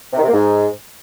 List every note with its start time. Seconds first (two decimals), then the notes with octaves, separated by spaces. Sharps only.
0.13 C3
0.18 D#3
0.23 C3
0.28 A#3
0.33 G#2